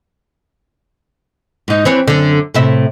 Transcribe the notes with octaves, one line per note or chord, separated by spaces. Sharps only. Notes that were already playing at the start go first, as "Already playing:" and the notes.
G#2 D#4
E3 C4 C#5
F#2 D3
A2 C3 E5